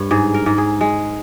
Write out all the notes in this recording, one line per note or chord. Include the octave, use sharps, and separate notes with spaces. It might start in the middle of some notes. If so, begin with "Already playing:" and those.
Already playing: G2 C#5
G#2 G#4
A#4
G#2
G#4
G#3